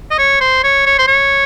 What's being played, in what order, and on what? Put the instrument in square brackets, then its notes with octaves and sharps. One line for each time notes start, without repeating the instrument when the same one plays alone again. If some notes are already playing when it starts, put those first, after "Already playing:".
[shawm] D#5
C#5
C5
C#5
C#5
C5
C#5